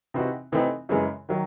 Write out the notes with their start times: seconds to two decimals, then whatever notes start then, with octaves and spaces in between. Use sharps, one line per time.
0.14 C3 E3 C4 D#4 F#4
0.52 C3 E3 A3 C4 D#4
0.89 F#2 C#3 E3 G#3
1.29 D#3 F#3